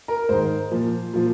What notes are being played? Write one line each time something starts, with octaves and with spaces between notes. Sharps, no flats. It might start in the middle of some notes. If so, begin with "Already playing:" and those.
A#4
G#2 D#3 C5
A#2 F3
A#2 F3